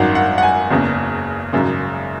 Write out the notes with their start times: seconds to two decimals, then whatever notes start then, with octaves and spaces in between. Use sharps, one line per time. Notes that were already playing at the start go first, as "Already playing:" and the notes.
Already playing: G#1 F#2 D#3 F#5
0.15 F#5
0.38 F#5
0.43 G#5
0.71 F#1 E2 C#3
1.53 G#1 F#2 C#3